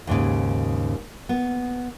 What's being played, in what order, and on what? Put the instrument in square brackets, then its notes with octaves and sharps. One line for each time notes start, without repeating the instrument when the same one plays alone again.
[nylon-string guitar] D#2 G#2 C#3
B3